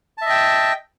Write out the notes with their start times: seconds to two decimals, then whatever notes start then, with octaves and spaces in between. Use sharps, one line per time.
0.18 A5
0.22 E5
0.26 D#5
0.30 G5